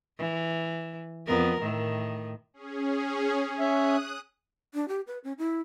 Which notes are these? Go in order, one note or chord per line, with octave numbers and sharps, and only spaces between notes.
E3
F2 B3 A#4
A2 D#3
C#4 G#4
C#4 E5 D#6 F#6
D4
G4
B4
C#4
E4